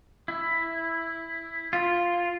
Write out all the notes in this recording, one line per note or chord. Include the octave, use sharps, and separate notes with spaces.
E4
F4